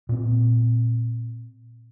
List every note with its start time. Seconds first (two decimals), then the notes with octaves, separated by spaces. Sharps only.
0.09 A#2 C4